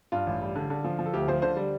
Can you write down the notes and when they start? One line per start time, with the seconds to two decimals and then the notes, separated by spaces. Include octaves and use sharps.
0.12 G2 F4
0.27 A1
0.42 G3
0.55 D3
0.70 D3
0.84 F3
0.99 F3
1.06 A4
1.14 D2 G4
1.28 F3 C5
1.42 D3 C5
1.57 G3